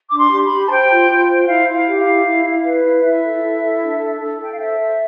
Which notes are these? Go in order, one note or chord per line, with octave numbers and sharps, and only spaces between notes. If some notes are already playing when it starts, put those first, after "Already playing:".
D4 D6
C6
G4
B5
G4
A5
C5 G5
F4
F4
C5
G5
E4 F5
E4
F5
G4
F5
E4
E4
E4
B4
E4
E4 E5
A4
E4
A4
D4
A4
A4
A4 G5
F5
C5 E5
C5